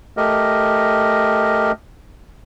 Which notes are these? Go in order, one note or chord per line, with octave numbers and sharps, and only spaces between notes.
A3 G4 A#4 D#5